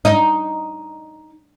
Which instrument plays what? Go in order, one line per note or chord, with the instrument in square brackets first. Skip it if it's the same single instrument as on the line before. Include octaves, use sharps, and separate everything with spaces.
[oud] D#4